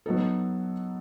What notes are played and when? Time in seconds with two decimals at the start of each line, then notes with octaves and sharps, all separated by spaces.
0.06 F#3 B3 D#4 A4